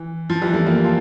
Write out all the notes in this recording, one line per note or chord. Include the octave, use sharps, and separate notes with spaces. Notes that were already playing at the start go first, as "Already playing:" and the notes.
Already playing: E3
F3
E3 G3
F3 A3
G3 A#3
F4 A4